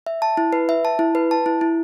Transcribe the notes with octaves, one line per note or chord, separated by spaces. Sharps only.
E5
A5
E4
B4
E5
A5
E4
B4
A5
E4
E4